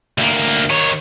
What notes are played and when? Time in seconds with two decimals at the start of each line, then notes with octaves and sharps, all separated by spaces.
0.18 D2 A#3
0.70 D#3 C#5